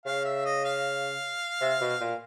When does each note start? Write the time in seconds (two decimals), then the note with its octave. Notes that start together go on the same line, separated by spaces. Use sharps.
0.06 C#3 F5
0.25 E5
0.45 D#5
0.65 F5
1.61 C3
1.81 B2
2.01 A#2